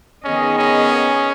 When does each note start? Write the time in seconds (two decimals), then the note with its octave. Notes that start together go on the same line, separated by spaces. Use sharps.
0.24 D#3 B3 C#4 G#4 D#5
0.58 C#4